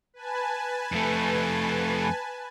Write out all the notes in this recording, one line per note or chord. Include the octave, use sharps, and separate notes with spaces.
B4 G#5 A5
F2 A3